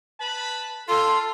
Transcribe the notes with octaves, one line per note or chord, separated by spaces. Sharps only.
B4 A5 B5
F4 A4 C6